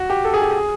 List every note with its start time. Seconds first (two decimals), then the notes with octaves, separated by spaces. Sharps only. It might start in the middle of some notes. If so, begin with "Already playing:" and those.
Already playing: F#4
0.10 G4
0.25 A4
0.34 G#4
0.42 G4
0.51 G#4